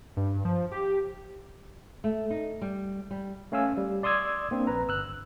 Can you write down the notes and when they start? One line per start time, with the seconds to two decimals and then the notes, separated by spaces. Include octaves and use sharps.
0.17 G2
0.45 F3
0.72 G4
2.04 A3
2.30 D#4
2.61 G3
3.11 G3
3.52 A3 C#4 F5 G#5 E6
3.77 G3
4.03 D5 C6 D#6 E6 G#6
4.51 A#3 C4 D4
4.67 A#1 B4 A#5
4.88 G1 E6 F#6